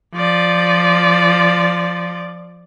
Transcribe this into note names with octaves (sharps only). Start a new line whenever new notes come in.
F3 D5